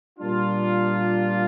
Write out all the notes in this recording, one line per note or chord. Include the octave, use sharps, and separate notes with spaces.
A#2 G3 A#3 D4 F4